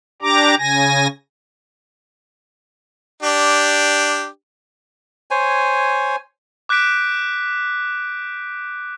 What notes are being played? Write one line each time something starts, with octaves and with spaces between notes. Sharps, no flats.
D4 G4 A#5 D6
C#3 G#5 A#6
D4 G4
C5 C#5 G#5
D6 F#6 G6 B6 D7